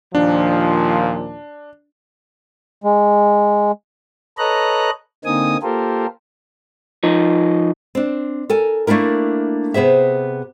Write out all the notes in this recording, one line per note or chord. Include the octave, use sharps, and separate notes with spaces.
D#2 A#2 F3 D4
G#3
A4 B4 C#5 D#5 A#5 F#6
D3 A#3 C4 D#4 G#5 D#6
A#3 F4 G4 A4 A#4 C5
F3 D#4
C4 D4
A4 A#4 G#5
A3 A#3 D4 E4 A#4
C3 B3 G#4 C5 E5